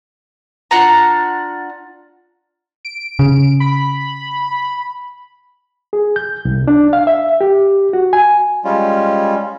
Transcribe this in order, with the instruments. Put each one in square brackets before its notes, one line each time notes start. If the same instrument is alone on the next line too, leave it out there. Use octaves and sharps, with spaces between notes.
[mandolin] D4 F4 F#5 A#5
[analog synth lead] D7
[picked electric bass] C#3
[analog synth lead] B5
[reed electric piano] G#4
G6
C2
D4
F5
E5
G4
F#4
G#5
[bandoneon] G3 G#3 C#4 F4